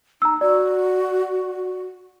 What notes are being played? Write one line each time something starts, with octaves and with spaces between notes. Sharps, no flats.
D#4 A#5 E6
F#4 D5